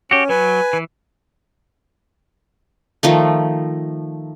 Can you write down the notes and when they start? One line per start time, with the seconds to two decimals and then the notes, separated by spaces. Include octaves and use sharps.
0.11 C#4 F#4 G4
0.29 F#3 B4 G#5
0.73 E3
3.03 D#3 F3 A3